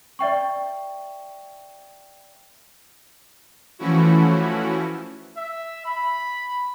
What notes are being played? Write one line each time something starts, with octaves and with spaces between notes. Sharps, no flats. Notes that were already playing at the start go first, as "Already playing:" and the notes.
D5 E5 G5 C#6
E3 F3 A3 C#4 E4 F#4
E5
B5